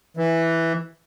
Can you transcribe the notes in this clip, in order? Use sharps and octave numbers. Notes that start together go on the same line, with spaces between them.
E3